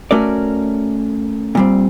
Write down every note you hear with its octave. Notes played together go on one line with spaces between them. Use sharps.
A3 C#4 F#4 A#4 D5
A#2 G3 C4